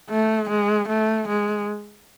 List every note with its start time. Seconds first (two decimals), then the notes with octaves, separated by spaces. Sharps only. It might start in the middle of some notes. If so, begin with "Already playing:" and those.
0.10 A3
0.50 G#3
0.89 A3
1.28 G#3